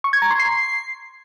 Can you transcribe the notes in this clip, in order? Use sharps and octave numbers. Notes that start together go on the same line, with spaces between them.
C#6
G#6
A#5
C6
C7